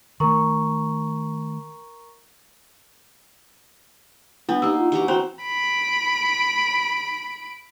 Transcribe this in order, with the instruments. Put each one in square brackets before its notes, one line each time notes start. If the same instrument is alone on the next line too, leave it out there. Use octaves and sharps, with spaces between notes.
[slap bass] D#3 A3 [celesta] A#4 A#5 C#6
[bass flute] G3 [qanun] B3 [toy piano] D4 E4
[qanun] A#3 D#4 [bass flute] G4 [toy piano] E6
[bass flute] F4
[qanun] E3 F#4 A#5 [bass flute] G4
[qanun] C4 [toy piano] C#4 C5 A#5 [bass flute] F#4
[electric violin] B5 D7